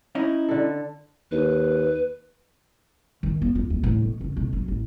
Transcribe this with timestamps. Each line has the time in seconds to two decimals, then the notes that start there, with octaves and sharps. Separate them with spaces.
0.15 C#4 D#4 E4
0.49 D3 A4
1.31 D#2 B4
3.23 D#3
3.42 B3
3.55 F4
3.70 D#2
3.83 A2
4.02 B2
4.21 C#2
4.37 B1
4.53 F#3
4.68 A1